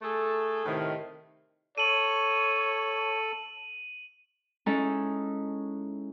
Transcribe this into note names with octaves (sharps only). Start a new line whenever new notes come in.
A3 G#4 A4
A2 C3 D#3
A4 C#5 D#7 F#7
G#3 C#4 D#4 E4 A4